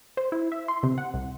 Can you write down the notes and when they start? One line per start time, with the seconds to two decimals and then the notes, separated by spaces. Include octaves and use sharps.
0.17 C5
0.32 E4
0.52 E5
0.68 C6
0.83 C3
0.98 F#5
1.14 C2